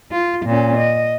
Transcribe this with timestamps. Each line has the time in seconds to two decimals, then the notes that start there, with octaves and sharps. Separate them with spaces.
0.11 F4
0.46 A#2 C#4
0.77 D#5